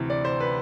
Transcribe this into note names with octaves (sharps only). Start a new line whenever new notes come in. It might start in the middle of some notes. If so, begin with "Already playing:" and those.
Already playing: D2 C3 E3
D5
C5
B4